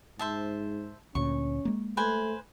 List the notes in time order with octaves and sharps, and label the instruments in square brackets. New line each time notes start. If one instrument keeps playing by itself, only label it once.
[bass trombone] G#2 [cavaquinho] C5 E5 A5
[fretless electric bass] D2 A#2 [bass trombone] C#4 [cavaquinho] C#6
[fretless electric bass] G#3 A#3
[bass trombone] A3 [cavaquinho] B4 C5 G#5